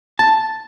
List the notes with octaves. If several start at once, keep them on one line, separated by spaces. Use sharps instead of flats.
A5